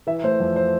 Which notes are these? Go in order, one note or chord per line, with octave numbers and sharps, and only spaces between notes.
E3 E5
A3 C5
F2
C5